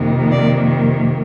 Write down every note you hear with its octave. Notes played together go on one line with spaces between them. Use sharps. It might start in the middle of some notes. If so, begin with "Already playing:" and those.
Already playing: F2 C3 D#3 A#3
D5